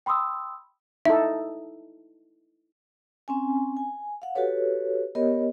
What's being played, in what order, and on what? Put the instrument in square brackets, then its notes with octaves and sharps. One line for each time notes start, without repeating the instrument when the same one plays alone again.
[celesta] G5 B5 C6 D#6 E6
[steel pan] D#4 E4 A4 [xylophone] E5
[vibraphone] C4 C#4 G#5
G#5
F5 F#5
F#4 G4 A4 B4 C#5
B3 G4 A#4 C#5 D#5